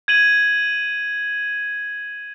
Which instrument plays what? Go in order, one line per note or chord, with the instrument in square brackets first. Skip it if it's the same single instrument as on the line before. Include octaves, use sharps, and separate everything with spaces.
[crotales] G#6 D#7 F#7